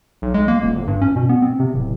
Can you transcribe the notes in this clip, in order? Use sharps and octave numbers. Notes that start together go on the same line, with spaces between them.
B1
G#3
A#3
D#1
G1
G2
C#4
B2
B3
C4
C3
D1